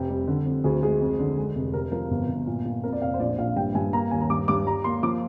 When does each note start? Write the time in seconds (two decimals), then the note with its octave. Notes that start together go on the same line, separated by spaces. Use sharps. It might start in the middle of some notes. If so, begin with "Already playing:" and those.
Already playing: F1 C3 G4
0.10 G3
0.27 D3
0.46 F2
0.64 D2 G#4
0.83 G#3 G#4
1.01 F2
1.19 D3
1.37 G#3
1.55 F1
1.73 C3 A#4
1.92 F3 A#4
2.11 G1
2.29 G1
2.47 A#2
2.65 A#2
2.84 F2 A#4
2.93 D5
3.02 F1 F5
3.14 C5
3.20 A#1 D5
3.38 A#1 F5
3.56 G2 G5
3.74 G2 G#5
3.93 A#3 A#5
4.11 D#2 G#5
4.21 A#5
4.30 G2 D6
4.48 G2 D6
4.67 G3 A#5
4.84 A#3 C6
5.03 F3 D6